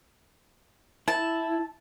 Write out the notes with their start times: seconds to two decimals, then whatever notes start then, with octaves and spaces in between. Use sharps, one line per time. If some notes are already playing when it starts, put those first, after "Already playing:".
1.08 E4 A5